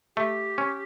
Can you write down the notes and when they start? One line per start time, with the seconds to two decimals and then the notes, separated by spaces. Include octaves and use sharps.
0.16 A3 G4
0.58 C#4